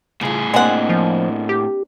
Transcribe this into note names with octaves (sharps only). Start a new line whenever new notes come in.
A2 C#3 F4 G#4
G#3 A#3 C4 D4 F#5
F3
G4